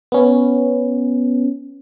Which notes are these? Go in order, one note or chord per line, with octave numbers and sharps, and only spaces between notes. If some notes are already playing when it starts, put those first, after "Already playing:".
B3 C#4